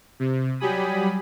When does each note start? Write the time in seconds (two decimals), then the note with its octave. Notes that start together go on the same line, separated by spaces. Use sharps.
0.19 C3
0.60 F#3 G3 G4 G#5 B5 D#6